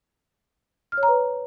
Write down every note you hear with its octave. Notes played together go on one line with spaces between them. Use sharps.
F6
C#5
A#5
B4